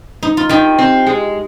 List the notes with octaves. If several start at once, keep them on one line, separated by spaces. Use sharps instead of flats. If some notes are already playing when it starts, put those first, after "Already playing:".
D#4
F4
D#3 D#4 G4
C4
G#3